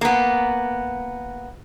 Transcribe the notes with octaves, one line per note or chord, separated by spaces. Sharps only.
A#3 B3